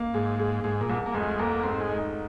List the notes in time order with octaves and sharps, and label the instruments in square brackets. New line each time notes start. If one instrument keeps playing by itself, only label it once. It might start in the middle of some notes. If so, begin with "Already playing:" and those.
Already playing: [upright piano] A#3
[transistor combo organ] G#2 [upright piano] G#4
[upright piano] G#4
[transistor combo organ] G#2 [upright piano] G#4
[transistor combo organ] A#2
[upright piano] C2
[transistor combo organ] A#3
[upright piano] F1 [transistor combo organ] G#3
[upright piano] F1 [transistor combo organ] A#3
[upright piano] G#2 [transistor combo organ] C4
[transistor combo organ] G#3
[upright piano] D#4